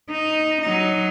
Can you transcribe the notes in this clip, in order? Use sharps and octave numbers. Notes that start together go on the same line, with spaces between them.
D#4
F#3 D#4